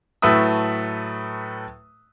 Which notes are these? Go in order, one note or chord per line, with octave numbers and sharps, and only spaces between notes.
A2 F#3 A3 B4 E5 D#6